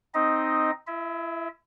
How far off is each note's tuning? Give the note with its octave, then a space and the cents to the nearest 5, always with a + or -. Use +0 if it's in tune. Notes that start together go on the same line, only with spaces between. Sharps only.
C4 +0 D#4 +0 D#5 +5
E4 +30 E5 -30